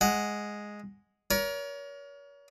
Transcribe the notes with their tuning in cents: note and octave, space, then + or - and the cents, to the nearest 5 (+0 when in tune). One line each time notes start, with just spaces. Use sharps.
G#3 +0 F#5 +0
A#4 +25 C#5 +35